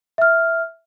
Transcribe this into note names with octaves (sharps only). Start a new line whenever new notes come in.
E5 F6